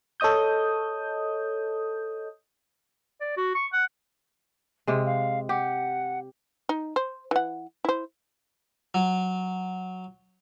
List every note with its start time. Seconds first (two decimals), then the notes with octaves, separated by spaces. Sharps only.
0.20 A4 C#5 D#5 D#6 G6
3.21 D5
3.37 F#4
3.55 C#6
3.73 F#5
4.87 C3 G#3 G#4
5.06 F5
5.49 G4 F#5
6.69 D#4
6.96 C5
7.31 E3 F#5
7.85 E4 C5
8.94 F#3